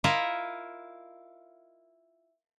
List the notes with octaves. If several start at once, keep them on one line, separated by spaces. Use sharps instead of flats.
E4 F4 A#4 D#5 E5